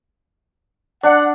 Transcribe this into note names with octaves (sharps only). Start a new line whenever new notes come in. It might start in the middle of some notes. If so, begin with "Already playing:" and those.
D4 F#5